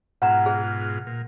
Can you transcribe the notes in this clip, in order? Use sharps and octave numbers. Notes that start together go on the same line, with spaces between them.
G#2 B2 F4 F#5 A#5
G#4
A#2